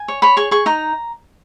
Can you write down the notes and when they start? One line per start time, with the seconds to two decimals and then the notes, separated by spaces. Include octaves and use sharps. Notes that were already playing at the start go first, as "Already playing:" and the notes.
Already playing: G#5
0.08 C#5
0.22 C#5 B5
0.37 G#4 C#6
0.51 G#4 C#6
0.66 D#4 A#5